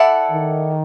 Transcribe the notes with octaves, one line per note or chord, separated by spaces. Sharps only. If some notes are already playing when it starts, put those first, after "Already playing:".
Already playing: E4 A4 D5 F#5
D#3